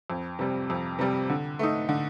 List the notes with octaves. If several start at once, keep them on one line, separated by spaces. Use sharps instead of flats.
F2
C3 G3
F2
C3 G3
D3
A3 D#4
D3